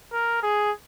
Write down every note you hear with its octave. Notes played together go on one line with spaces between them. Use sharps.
A#4
G#4